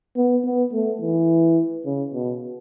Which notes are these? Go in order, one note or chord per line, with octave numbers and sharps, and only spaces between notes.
B3
B3
A3
E3
C#3
B2